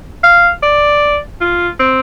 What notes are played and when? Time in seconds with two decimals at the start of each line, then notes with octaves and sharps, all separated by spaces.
0.23 F5
0.63 D5
1.41 F4
1.79 C4